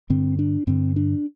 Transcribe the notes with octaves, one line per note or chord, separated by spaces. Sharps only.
G2 D3 C4
D4
G2 D3 C4
D4